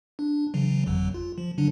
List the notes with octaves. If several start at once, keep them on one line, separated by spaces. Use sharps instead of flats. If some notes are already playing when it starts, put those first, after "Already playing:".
D4
C#3 E3 F#3
G1 F2 F#3
F4
F3
D3 F#3 D4